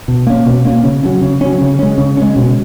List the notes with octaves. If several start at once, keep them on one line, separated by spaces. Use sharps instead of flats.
B2
A#3 C#4
B2
A#3 C#4
C#3
F#3 C#4
C#3
F#3 C#4
C#3
G#3 C#4
C#3
G#3 C#4
B2